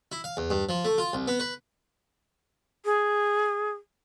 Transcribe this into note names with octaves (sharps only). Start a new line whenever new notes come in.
E4
F5
E2
G2
F3
A3
F4
C2
B3
B4
G#4